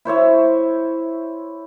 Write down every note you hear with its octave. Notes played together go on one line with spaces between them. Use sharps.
E4 C5 C#5 E5